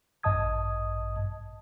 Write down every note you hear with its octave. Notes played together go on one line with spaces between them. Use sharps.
A1 G2 D#5 A5 D#6 G#6